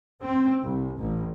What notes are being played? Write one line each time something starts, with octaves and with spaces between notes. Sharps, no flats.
C4
C2
A1